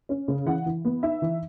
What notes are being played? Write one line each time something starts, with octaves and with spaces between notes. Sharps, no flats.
C#4
C#3
E3 F#5
E3
B3
D#4 E5
E3